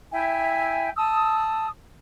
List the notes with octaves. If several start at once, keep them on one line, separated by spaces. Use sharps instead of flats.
E4 E5 G5 G#5
A5 D#6 E6